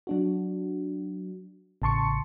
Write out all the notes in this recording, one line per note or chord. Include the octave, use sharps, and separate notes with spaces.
F#3 D4 F#4
A1 C#3 A5 C6 C#6 C#7